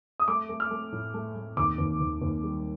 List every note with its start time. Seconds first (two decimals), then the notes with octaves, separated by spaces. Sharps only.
0.20 D#6
0.28 A3 D6
0.49 A3
0.60 F6
0.71 A3
0.92 A2
1.14 A3
1.36 A3
1.57 D#2 D6
1.78 D#2
2.00 D#2
2.22 D#2
2.44 G3